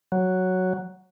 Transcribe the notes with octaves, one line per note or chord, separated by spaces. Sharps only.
F#3